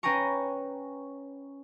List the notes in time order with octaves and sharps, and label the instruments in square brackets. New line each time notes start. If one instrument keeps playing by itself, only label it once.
[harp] C#4 B4 G5 G#5 A#5 C#6